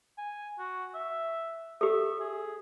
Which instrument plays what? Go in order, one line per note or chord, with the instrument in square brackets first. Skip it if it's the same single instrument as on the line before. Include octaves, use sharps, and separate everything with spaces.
[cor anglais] G#5
F#4
E5
[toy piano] G4 A4 [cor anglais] E5
[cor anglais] G#4